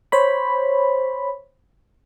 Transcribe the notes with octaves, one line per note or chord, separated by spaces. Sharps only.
C5 C#5 B5